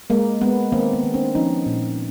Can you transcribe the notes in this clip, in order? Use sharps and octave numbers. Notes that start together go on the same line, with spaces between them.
G#3 A#3
G#3 B3
D#3 A#3 C4
B3
D#3
C4 D4
F3 C#4 D#4
A#2